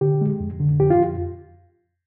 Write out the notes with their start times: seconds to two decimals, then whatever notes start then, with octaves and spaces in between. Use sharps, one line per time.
0.01 D3 G4
0.21 G#3
0.40 F2
0.60 D3
0.80 F2 G4
0.90 F4
0.99 F2